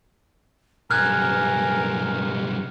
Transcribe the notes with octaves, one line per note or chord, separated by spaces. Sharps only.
B1 G2 A#4 G#5 F6 F#6 G#6